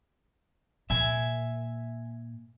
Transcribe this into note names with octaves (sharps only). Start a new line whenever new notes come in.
A#2 E5 G#5